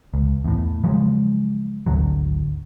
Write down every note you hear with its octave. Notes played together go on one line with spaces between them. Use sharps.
C#2
E2 A2
C#3 F3 F#3 G#3
G#1 D2 D3 F#3